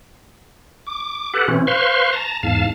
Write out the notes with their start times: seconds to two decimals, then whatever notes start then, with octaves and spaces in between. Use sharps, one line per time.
0.87 D6
1.34 G4 A4 B4 F#5
1.48 B2 E3 C4 C#4
1.67 B4 C5 F5 C6 C#6
2.13 A5 A#5
2.43 E2 G#2 F5 A5